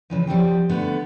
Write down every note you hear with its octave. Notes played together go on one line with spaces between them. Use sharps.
C#3 E3 F3
F3 G3 C4 G5
D3 A3 B3